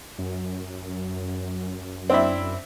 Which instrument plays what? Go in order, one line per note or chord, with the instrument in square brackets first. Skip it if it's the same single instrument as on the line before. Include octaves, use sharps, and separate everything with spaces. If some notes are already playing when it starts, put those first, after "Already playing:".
[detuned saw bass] F#2
[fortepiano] C4 D4 E4